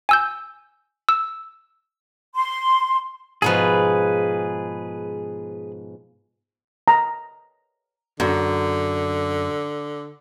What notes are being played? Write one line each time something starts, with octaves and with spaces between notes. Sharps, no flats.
G#5 E6 G6
E6
C6
G#2 B2 F3 G#4 B4
A#5
F#2 D3